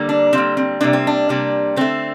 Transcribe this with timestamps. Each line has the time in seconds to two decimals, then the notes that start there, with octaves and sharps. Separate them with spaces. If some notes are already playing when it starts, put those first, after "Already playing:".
Already playing: D3 G3 A#3
0.09 D4
0.33 D3 G3 A#3 C4
0.57 C4
0.81 C3 G3 A#3 D4
0.93 C4
1.07 D4
1.29 C3 G3 A#3
1.76 D3 A3 C4